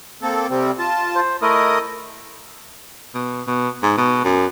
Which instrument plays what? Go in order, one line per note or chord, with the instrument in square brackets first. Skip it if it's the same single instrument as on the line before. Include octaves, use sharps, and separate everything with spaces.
[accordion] A#3 C4 A4
C3 G3 C4
F4 A5
[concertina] C5
[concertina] A3 E4 A#4 [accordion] D#5 D#6
[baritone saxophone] B2
B2
G#2
B2
F#2